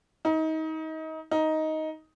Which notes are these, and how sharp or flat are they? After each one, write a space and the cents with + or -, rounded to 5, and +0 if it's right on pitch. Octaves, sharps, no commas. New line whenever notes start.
D#4 +30
D#4 +10